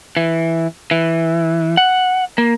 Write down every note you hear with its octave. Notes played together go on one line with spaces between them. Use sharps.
E3
E3
F#5
A#3